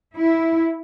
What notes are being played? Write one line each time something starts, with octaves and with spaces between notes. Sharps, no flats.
E4